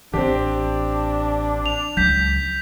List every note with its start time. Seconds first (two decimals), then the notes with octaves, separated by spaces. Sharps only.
0.14 A1 E3 C4 D4 G4
1.66 F7
1.97 C#2 F#3 G6 B6